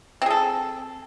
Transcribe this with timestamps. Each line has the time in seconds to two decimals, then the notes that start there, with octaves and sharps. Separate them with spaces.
0.22 C4
0.26 G#4
0.30 A4